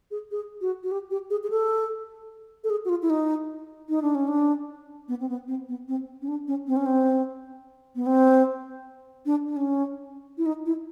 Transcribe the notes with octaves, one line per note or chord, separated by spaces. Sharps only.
G#4
G#4
F#4
F#4
G4
G4
G#4
G#4
A4
A4
G#4
F#4
F4
E4
D#4
D#4
D4
C#4
D4
B3
C4
B3
C4
B3
C4
C#4
D4
C#4
C4
C#4
C4
B3
C4
D4
D4
C#4
E4
D#4
E4